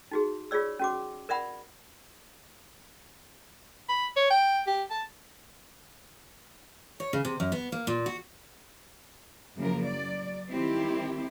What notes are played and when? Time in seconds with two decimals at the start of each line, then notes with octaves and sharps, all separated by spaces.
0.11 D#4 F#4 G#4
0.51 F4 G#4 C#5 D5 E6
0.79 C#4 F#4 D6
1.29 A#4 D5 E5 F#5 B5
3.89 B5
4.17 C#5
4.31 G5
4.67 G4
4.91 A5
7.00 C#5
7.13 C#3
7.25 C3
7.40 F#2
7.52 B3
7.72 A#3
7.87 A#2
8.06 F#4
9.57 F#2 C#3 F3 A#3 E4 A#4
9.86 F#3 D5
10.52 D#3 G3 C4 E4 G4